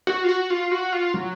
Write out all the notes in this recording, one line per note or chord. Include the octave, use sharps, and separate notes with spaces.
F#4
F4
F#4
F4
F#4
F4
F#3